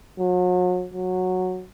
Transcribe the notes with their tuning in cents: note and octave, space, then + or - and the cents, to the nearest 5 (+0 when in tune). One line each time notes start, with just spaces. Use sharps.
F#3 -40
F#3 -10